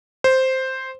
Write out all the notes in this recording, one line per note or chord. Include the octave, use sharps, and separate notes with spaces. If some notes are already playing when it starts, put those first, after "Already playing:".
C5